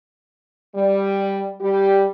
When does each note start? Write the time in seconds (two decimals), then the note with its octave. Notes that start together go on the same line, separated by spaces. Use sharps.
0.75 G3
1.60 G3 G4